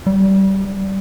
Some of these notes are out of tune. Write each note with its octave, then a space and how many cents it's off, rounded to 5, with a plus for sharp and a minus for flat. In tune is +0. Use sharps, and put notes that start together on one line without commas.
G3 -20